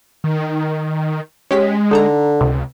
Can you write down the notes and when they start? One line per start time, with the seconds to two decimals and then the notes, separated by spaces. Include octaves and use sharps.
0.24 D#3
1.51 G#3 C#4 G4 B6
1.91 D3 D#4 A4 A#5
2.41 C#2 C3